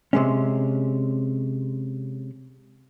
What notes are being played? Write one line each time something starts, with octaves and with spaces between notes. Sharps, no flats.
C3 G#3 C#4